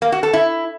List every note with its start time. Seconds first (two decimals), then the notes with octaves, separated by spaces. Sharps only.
0.02 A#3
0.12 F#4
0.23 A4
0.33 E4